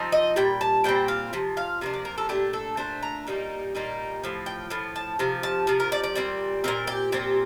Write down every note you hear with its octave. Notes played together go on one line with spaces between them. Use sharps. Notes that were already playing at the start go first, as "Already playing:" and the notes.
Already playing: F3 C4 D#4
D#5
A#2 G3 G5
A5
A#2 G3 C4 G5
F5
C3 F3
F5
C3 F3 A#3 D4
D5
A#4
A4
A#2 A3 D4 G4
A4
A#2 A3 D4 C5
A#5
A#2 G3 A#3 D#4
A#2 G3 A#3 D#4
A2 F3
G5
A2 F3
A5
C3 F3
A5
C3 F3
A#4
D5
D5
A#2 G3 C4
A#2 G3 C4 A#4
G4
A#2 F3 C4 G4